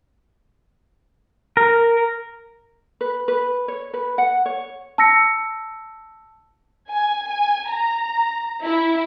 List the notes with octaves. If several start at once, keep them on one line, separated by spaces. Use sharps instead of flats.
A#4
B4
B4
C#5
B4
F#5
C#5
A5 E6 A#6 C#7
G#5
G#5
A#5
E4